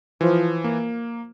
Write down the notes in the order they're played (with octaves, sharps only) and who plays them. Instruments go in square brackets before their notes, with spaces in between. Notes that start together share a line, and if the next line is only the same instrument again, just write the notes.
[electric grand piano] E3 [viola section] F3
[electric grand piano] A#3